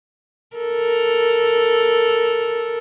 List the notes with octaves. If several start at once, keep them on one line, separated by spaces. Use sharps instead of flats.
A4 A#4